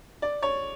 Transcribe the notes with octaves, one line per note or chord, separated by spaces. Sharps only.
D5
C#5